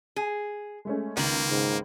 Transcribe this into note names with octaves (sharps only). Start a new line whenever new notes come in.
G#4
G#3 A3 C#4
C#2 D#3 A#3 F#7
G#2